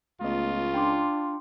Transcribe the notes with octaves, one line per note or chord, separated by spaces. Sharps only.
C#2 A3 B3 F4 D#5
D4 G5 C6 D6